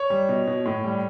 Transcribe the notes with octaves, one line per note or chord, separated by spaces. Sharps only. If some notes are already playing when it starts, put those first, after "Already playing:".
Already playing: C#5
G3
B2
B2
A2
G3